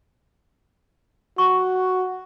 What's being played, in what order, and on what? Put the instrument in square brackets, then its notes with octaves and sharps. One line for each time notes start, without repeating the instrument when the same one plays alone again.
[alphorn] F#4 [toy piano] C#6